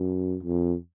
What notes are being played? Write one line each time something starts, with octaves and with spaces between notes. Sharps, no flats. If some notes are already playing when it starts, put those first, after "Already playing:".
Already playing: F#2
F2